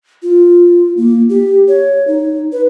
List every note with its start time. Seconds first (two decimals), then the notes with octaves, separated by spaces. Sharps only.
0.23 F4
0.97 A#3
1.29 G4
1.68 C#5
2.07 D#4
2.52 B4